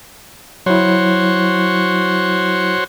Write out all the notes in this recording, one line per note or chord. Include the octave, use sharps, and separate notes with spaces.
F#3 E4 F#4 C5 C#5